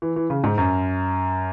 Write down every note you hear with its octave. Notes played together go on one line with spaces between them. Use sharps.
E3
E3
C#3
G#2
F#2